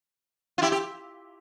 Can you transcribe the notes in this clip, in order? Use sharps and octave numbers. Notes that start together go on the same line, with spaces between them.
F4
E4 G4
G4